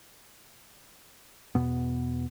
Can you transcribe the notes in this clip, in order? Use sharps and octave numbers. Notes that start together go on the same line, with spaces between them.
E2 B2 B3